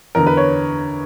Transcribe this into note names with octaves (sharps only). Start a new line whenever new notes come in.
E2 D3 A#4
B4
C#5